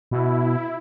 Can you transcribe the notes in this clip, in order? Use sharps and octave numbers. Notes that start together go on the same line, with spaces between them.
B2 E4